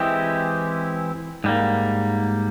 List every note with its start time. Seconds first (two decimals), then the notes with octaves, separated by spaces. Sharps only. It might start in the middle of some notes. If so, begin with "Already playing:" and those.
Already playing: E3 G#3 C4 E4 G4
1.44 G#2 G3 A#3